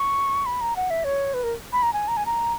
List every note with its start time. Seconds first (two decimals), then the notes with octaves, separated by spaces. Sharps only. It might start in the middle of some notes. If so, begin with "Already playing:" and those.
Already playing: C#6
0.46 B5
0.61 A#5
0.76 F#5
0.90 E5
1.04 C#5
1.34 B4
1.43 A#4
1.73 B5
1.83 A#5
1.93 G#5
2.08 A#5
2.17 G#5
2.26 A#5